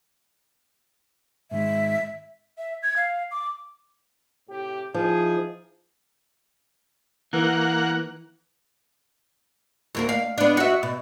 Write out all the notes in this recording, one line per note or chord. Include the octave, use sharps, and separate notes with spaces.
G#2 D#3 G#3 E5
E5
G#6
F5
D6
A2 C3 G4
F3 D#4 E4 G#4
E3 A#3 F#5
D2 A#3 A#4
F5
B3 D4
F#4 E5
B2